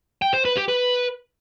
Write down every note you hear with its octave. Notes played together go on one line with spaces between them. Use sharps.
G5
C5
B4
G4
B4